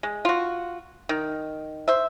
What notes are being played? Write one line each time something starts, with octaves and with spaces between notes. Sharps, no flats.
G#3
F4 F#4
D#3
C5 E5